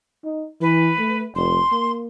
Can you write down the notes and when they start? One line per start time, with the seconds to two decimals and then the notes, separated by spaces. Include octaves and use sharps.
0.25 D#4
0.61 E3 B4
0.99 A3
1.36 F1 C6
1.72 A#3